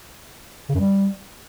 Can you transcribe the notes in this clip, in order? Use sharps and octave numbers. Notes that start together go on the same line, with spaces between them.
C#3
F#2
G3